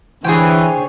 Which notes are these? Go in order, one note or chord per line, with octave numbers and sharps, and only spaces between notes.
D3 E3 G#4 C5 C#5 G5 G#5